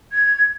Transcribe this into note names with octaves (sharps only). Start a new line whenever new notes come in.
G#6